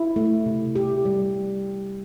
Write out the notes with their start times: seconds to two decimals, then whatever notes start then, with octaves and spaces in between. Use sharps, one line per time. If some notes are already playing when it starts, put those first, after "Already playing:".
Already playing: E4
0.16 A3
0.46 C3
0.75 G4
1.05 G3